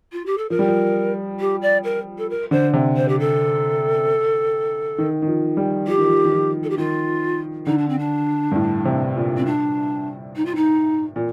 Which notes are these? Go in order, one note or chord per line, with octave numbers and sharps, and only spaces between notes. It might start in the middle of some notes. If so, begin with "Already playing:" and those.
F4
G4
A4
F3 A#4
G3
F3
G4
D5
A#4
A4
A#4
D3 C5
C3
C5
G4
A4
D#3
D#3
F3
G3
F3 G4
D#3
F3
D#3
F3
A4
G4
D#3 F4
D3 D#4
D4
C4
D4
G2
A2
C3
A#2
C4
D4
D#4
F4
D#4
A#2